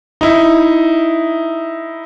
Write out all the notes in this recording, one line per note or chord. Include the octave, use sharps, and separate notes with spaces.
D#4 E4